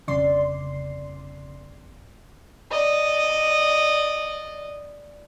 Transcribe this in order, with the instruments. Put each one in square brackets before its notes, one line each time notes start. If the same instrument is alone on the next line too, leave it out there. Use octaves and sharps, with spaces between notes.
[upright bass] G1 F2 [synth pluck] C#3 D5 C6
[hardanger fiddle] D5 D#5